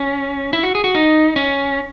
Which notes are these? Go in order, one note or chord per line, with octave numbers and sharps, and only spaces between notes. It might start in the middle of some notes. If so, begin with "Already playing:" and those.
Already playing: C#4
E4
F#4
G#4
F#4
D#4
C#4